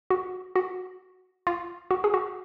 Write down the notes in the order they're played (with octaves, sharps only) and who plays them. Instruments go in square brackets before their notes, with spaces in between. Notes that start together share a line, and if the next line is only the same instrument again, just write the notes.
[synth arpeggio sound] F#4
F#4
F4
F#4
G#4
F#4